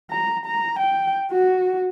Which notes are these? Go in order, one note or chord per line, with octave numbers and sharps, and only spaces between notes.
A#5
A#5
G5
F#4